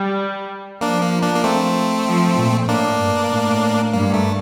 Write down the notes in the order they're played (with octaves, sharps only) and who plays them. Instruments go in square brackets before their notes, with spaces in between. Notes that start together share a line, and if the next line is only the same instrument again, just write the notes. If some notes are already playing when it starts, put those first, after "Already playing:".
Already playing: [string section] G3
[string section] F3 [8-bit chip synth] A#3 D4
[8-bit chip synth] A#3
A#3 D4
A#3
A3 C4
[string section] F3
A#2
[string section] A2 [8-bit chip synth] A#3 D4
[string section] G2
A2
[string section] G2 [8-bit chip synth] A#3
[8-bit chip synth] A3